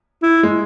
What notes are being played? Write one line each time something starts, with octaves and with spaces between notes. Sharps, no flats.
E4
G#3